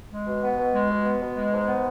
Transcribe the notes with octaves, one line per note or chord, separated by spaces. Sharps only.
G#3
B2
B3
B2
G#3
B2
B3
B2
G#3
G#2
B3